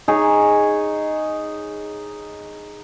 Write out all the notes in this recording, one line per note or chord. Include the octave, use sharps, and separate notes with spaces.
D#4 G#4 C#5